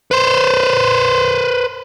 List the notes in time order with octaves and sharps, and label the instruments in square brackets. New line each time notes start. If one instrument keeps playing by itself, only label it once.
[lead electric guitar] B4 C5